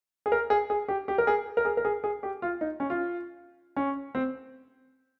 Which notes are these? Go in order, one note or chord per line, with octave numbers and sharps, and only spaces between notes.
G#4
A#4
G#4
G#4
G4
G4
A#4
G#4
A#4
G#4
A#4
G#4
G#4
G4
F4
D#4
C#4
F4
C#4
C4